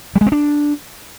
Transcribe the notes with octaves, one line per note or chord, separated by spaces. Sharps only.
G3
G#3
C4
D4